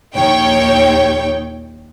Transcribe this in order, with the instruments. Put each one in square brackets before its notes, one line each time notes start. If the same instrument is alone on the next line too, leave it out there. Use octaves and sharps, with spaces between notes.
[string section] A#1 D#2 C#5 G5